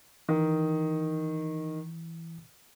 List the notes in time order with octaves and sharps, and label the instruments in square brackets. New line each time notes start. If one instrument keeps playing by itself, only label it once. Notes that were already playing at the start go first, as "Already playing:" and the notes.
[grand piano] D#3 [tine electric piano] E3